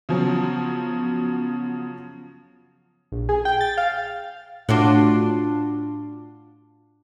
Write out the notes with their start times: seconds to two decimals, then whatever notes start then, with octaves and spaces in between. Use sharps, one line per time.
0.09 C#3 F3 F#3 B3
3.12 A#1
3.29 G#4
3.45 G5
3.61 A6
3.77 F5
4.69 A2 D4 F4 F#4